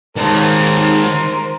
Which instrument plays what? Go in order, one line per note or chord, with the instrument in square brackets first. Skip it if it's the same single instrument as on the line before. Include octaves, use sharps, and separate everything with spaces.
[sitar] D#2 [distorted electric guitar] D#3 G#3 [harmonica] A#4 C5